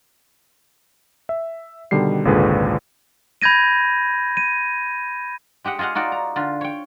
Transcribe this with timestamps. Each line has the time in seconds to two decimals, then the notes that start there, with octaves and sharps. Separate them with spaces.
1.29 E5
1.91 B2 D3 D#3 G3 C7
2.25 G#1 C#2 A#2 D3 G#4 B4
3.42 B5 G6 G#6 A#6 D#7
4.37 D#7
5.64 G#3 G4 D#5 F#5
5.79 F4 G#4 D#5 F5 F#5
5.95 D#4 F4 F#4 D5
6.12 A#5
6.36 D3 F4
6.61 C#5 G5